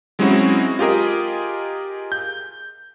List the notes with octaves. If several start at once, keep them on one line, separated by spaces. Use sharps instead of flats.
F#3 G#3 C4 C#4 E4 F#4
F4 G4 G#4 A#4 D#5
G6